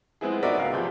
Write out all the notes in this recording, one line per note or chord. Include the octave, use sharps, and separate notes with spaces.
G#3 B3 C4 E4 G#4
B3 D#4 F#4 A#4 D5 E5
C#2 F5
G#1 C3 F3 G#4 G6